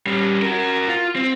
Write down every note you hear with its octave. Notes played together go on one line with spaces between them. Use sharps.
G3 C#4
F#4 A#4
F4
C4